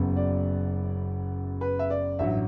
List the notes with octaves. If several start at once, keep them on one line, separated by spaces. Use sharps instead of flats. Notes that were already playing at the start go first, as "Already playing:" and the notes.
Already playing: F#1 F#2 F#3 B3
D5
B4
E5
D5
A1 G2 F#3 E5